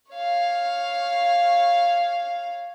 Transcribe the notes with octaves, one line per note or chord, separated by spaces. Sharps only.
C#5 F5